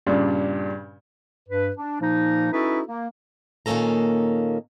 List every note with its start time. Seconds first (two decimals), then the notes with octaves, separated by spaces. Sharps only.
0.07 G2 A#2 C#3 D4
1.49 G2 B4
1.77 D4
2.01 A#2 F3 A#3 D#4
2.53 C#4 D#4 E4 F#4 A4 B4
2.88 A#3
3.66 A#2 D#3 A#3 C#4 A4 A#5